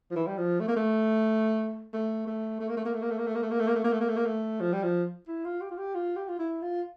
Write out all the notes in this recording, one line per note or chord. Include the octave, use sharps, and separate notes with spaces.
F3
E3
G3
F3
A3
A#3
A3
A3
A3
A3
A#3
A3
A#3
A3
A#3
A3
A#3
A3
A#3
A3
A#3
A3
A#3
A3
A#3
A3
A#3
A3
A#3
A3
F3
G3
F3
E4
F4
G4
F4
G4
F4
G4
F4
E4
F4